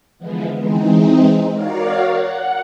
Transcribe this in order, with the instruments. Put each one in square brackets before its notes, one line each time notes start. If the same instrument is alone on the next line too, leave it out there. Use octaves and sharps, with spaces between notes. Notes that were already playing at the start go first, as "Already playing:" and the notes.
[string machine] D3 E3 F3 G#3 B3
E3 G#3 C4 D#4
F#4 A#4 C#5 D5 F5
F#5